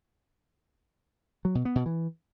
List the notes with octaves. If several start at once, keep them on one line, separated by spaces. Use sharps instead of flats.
F#3
B2
B3
B2
E3